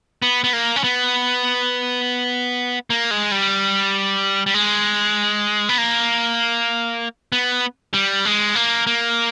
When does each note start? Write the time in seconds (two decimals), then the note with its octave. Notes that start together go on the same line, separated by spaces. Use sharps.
0.22 B3
0.44 B3
0.53 A#3
0.76 C#4
0.84 B3
2.90 A#3
3.11 G#3
3.31 G3
4.46 G3
4.54 G#3
5.69 B3
5.78 A#3
7.32 B3
7.94 G3
8.25 G#3
8.55 A#3
8.87 A#3